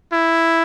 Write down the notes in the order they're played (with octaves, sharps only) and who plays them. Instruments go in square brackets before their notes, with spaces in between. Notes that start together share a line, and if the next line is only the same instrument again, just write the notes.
[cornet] E4